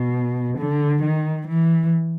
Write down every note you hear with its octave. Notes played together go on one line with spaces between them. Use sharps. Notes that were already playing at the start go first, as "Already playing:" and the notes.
Already playing: B2
D3
D#3
E3